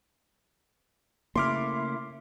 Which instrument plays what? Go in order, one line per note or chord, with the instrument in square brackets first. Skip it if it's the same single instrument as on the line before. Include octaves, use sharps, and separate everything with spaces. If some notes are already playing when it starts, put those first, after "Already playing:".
[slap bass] C#3 A#3 [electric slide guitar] A3 E4 [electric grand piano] C6 D6 F6